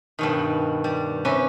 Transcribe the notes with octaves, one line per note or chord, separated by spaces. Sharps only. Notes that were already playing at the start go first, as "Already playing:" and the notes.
G2 B2 D#3
G3
C3 C#4 B4